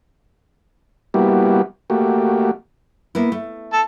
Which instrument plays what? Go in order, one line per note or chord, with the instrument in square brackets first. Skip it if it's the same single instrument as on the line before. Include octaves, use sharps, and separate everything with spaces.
[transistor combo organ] G3 A#3 B3 E4 F#4 G4
A3 A#3 F#4 G4
[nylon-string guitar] A#3 B3 E4
A3
[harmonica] A4